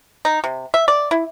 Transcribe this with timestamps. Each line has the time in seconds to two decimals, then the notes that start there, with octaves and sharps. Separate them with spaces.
0.25 D#4
0.44 C3
0.74 E5
0.88 D5
1.11 E4